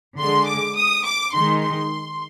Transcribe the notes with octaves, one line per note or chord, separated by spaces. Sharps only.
D3 G#3 C6
D6
D#6
D6
D#3 G#3 C6
C6